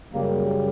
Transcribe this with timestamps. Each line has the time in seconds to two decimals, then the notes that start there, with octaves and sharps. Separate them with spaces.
0.13 F#2 C#3 G3 A#3